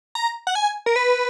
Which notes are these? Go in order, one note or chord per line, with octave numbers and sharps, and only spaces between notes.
A#5
F#5
G#5
A#4
B4